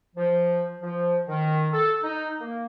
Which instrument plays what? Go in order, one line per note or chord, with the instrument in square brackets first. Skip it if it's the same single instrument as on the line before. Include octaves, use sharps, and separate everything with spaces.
[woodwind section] F3
F3
D#3
A4
D#4
A#3